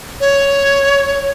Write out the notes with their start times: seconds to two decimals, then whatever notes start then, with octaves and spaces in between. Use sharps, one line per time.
0.20 C#5